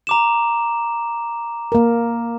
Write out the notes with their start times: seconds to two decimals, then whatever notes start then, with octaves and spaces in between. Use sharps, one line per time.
0.07 A#5 D6 E7
1.72 A#3 A#4